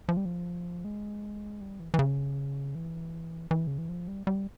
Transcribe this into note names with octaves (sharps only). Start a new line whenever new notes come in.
F3
G3
F3
G#3
G3
E3
E3
C#3
E3
E3
C#3
E3
F3
G3
G3